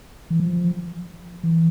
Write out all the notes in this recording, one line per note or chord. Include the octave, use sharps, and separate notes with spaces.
E3
F3
E3